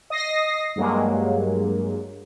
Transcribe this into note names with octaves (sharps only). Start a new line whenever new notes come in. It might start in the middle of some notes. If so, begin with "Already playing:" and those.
D#5 D#6 A#6 C7
G2 F#3 G#3 A#3